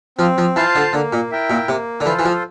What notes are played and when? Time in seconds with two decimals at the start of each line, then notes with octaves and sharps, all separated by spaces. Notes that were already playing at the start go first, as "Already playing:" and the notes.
0.18 F3 C4
0.38 F3
0.56 E3 F4 C5 F5 A5
0.75 D3
0.93 D3 A#3
1.13 A#2
1.31 E4 A#4 E5 G5
1.50 A#2
1.68 C3 A#3
2.00 D3
2.06 E3 F4 A4 C5
2.19 E3
2.25 F3